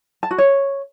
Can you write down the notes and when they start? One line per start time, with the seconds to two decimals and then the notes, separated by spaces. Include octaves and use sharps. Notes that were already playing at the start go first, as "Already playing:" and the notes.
0.23 A5
0.31 F#4
0.38 C#5